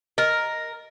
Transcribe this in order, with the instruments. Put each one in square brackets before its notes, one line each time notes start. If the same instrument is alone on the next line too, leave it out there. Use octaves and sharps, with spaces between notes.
[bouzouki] A#4 [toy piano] D#5